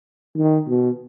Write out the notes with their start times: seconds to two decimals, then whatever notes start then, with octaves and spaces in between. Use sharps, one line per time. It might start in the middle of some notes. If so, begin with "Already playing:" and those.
0.37 D#3
0.68 B2